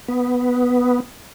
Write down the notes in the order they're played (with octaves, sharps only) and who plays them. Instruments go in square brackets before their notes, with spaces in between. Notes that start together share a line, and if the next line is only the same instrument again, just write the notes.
[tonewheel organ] B3